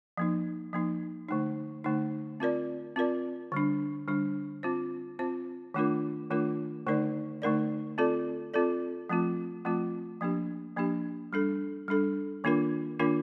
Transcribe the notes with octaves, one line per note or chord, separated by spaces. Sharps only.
F3 A#3 D#4
F3 A#3 D#4
D3 A3 D#4
D3 A3 D#4
C4 F4 A#4 D5
C4 F4 A#4 D5
D3 G3 D4
D3 G3 D4
C4 F4 C5
C4 F4 C5
D#3 A3 D4 F4 A#4
D#3 A3 D4 F4 A#4
D3 A3 D#4 A#4 D5
D3 A3 D#4 A#4 D5
C4 F4 A4 D5
C4 F4 A4 D5
F3 A3 C4 F4
F3 A3 C4 F4
F3 A#3 D4 G4
F3 A#3 D4 G4
G3 D4 A4
G3 D4 A4
D#3 A#3 D4 F4 A#4
D#3 A#3 D4 F4 A#4